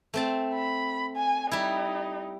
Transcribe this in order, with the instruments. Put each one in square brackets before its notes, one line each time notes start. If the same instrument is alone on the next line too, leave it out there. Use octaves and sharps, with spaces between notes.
[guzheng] A3 C4 A5
[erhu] B5
G#5
[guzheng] G3 E4 [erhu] D#4